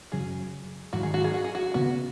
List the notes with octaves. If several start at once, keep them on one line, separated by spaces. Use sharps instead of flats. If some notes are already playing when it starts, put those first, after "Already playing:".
F#2 C#3 F#3 G#4
G#2 D#3 F#3 F#4
G#4
F#4
G#4
F#4
G#4
F#4
C#3 B3 F#4